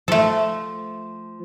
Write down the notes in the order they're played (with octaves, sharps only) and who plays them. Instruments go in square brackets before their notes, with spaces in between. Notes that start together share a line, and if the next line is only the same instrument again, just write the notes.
[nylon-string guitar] F3 [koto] A3 A4